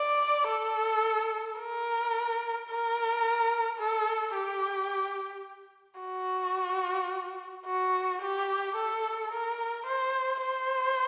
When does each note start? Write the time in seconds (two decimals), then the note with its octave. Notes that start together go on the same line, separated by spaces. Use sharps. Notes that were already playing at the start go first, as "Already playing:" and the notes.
Already playing: D5
0.47 A4
1.58 A#4
2.69 A#4
3.79 A4
4.34 G4
6.00 F#4
7.66 F#4
8.21 G4
8.76 A4
9.32 A#4
9.86 C5
10.42 C5